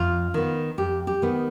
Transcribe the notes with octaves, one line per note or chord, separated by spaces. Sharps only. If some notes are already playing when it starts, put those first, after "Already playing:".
Already playing: F2 F4
D#3 B3
F2 G4
G4
D#3 B3